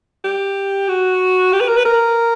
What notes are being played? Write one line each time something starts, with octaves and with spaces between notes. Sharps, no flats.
G4
F#4
G4
B4
A#4
B4
A#4